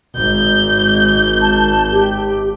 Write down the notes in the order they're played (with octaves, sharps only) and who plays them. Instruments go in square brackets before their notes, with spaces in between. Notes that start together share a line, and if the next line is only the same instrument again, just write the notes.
[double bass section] G#1 [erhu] G6
[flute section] A5
G4